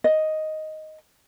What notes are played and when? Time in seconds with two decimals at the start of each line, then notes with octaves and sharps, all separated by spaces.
0.04 D#5